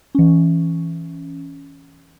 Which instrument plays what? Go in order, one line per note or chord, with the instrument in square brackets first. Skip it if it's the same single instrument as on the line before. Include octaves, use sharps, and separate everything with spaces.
[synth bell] E3 C#4